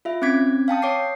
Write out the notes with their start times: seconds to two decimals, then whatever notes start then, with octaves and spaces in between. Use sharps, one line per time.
0.05 F4 E5
0.22 C4 C#4 D6 G#6 B6
0.68 F5 G5 A5 D#6
0.82 C#5 D6 C7